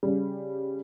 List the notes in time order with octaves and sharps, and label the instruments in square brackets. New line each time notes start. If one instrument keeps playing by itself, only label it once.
[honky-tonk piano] C#3 G3